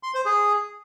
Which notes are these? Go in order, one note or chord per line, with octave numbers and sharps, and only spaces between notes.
C6
C5
G#4